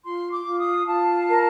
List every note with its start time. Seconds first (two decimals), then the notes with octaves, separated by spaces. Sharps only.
0.04 F4 C6
0.32 D6
0.46 F4
0.59 D#6
0.87 F4 A5
1.29 A#4